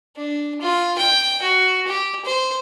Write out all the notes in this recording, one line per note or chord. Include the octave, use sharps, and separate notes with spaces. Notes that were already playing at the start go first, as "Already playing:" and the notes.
D4
F4
G5
F#4
G4
C5